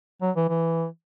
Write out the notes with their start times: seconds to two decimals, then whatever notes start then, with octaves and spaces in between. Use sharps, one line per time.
0.21 F#3
0.36 E3
0.48 E3